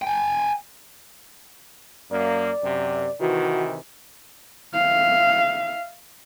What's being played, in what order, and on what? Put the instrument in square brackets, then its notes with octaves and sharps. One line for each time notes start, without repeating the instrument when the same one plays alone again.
[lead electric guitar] G5 G#5
[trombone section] F#2 A#3 [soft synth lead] D5
[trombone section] F#2 C3
[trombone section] C3 D#3 E3 [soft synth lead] F#4
[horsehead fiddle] E5 F5